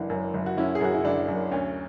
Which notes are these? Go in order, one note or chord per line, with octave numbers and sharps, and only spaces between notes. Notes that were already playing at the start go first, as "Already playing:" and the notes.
Already playing: F#1 E3 D4 F#4
F#2
F#1
F#4
F#1 C#4 E4
G#4
F#2 F#4
E4
F#1 D4
F#2
D2 C#4